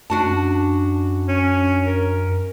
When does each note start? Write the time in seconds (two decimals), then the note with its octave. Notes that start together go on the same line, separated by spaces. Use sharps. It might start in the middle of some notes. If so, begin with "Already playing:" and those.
0.10 F#2 D4 F#4 A5
1.28 C#4
1.87 A#4